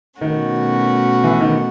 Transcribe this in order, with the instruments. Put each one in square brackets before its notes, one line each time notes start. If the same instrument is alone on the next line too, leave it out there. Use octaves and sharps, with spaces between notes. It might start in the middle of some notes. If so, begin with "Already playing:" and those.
[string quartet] B2 A3 C#4 F#4 [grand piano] D#3
[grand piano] E3
D#3